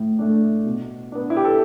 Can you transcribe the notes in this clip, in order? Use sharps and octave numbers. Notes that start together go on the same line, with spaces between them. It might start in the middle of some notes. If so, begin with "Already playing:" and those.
Already playing: A2 A3
A3 D4
B2
B3 D4
E4
G4
A4